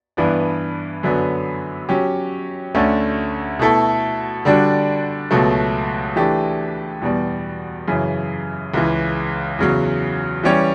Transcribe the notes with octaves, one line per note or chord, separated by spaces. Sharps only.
G2 E3 B3 D4
F#2 D3 F#3 B3
F#3 C#4 G4
D2 D3 A3 C#4
B2 A3 E4 A4
D3 G3 D4 F#4
C#2 B2 F#3 A3
E3 A3 D4 G4
E2 B2 G3
F#2 C#3 E3
C#2 C#3 E3
E2 C#3 F#3
E3 G3 C#4 G4 C#5